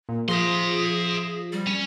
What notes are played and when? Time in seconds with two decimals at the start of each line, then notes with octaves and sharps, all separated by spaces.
0.09 A#2
0.29 F3 G#4 E5 C6 A#6
1.52 G3
1.67 C#4